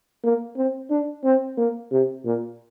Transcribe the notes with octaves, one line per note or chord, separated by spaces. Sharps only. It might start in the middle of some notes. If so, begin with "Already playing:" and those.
A#3
C4
D4
C4
A#3
C3
A#2